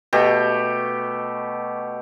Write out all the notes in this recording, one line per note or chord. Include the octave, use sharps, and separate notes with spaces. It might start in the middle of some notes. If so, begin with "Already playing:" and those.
B2 A3 G4